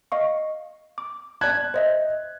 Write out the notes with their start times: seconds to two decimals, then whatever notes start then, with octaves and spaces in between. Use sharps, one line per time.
0.12 D#5 F5 C#6
0.98 D6
1.41 D5 A5 F#6 G#6
1.74 C5 D#5 E5